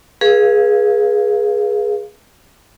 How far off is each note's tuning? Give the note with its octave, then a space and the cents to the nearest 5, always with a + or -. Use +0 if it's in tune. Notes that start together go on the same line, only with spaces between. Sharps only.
G#4 +0 B4 -40 F5 +0